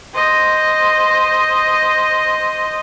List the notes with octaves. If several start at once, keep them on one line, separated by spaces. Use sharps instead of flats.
C5 D#5